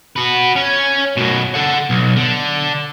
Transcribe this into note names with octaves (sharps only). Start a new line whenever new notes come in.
F#4 B4
C#4
F#2 B2
A4 F#5
B1
D3